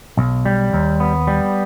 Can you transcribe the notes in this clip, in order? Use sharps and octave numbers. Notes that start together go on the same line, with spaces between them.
B1
G3
D#2
B3
G3